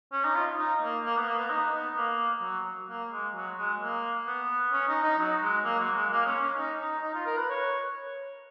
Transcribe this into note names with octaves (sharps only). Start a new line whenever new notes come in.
C#4
D#4
F4
D#4
A#3
A#3
B3
A#3
B3
D#4
B3
A#3
F#3
A#3
G#3
F#3
G#3
A#3
B3
C#4
D#4
D#4
F#3
G#3
A#3
F#3
G#3
A#3
C#4
C#4
D#4
D#4
D#4
F4
A#4
B4
C#5